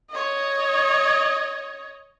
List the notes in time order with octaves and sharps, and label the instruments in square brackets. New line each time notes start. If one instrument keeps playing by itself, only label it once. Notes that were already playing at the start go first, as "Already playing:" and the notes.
[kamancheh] C#5 D#5